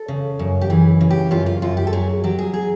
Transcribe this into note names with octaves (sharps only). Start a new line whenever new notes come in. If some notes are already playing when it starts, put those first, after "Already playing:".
Already playing: A4
C#3
F#2
G4
E3 G#4
C#3
G4
F#2 F4
F4
F#2 F4
G4
A4
F#3 G#4
F#3 G4
G#4
G#4